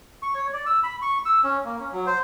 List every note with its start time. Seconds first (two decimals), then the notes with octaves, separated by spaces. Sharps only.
0.22 C#6
0.35 C#5
0.53 D5
0.66 E6
0.83 B5
1.02 C#6
1.25 E6
1.43 C#4
1.65 A#3
1.79 C#4
1.92 F#3
2.06 C5